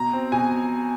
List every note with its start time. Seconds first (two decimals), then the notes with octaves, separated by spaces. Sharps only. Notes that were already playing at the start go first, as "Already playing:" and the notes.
Already playing: B2 A#5
0.13 C4
0.32 B2 G#5